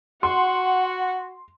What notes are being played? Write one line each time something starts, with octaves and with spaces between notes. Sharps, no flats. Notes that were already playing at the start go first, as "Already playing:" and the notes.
F#4 F#5 C6